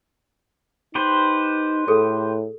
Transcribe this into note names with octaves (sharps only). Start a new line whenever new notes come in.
D#4 G4 B4 C5
A2 G#4 A4